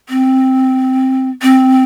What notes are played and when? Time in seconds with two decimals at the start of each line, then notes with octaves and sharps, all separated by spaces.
0.09 C4
1.42 C4